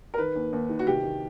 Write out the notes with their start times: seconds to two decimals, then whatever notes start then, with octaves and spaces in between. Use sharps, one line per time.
0.14 A#4
0.18 D#3 B4
0.35 D#2
0.53 D#2
0.69 D#3
0.79 F#4
0.87 C2 G4
1.03 D#3